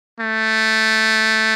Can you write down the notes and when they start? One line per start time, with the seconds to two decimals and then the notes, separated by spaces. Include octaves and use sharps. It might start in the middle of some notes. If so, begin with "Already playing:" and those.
0.20 A3